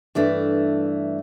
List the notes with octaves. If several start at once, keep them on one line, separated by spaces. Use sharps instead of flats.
G2 E3 A3 D4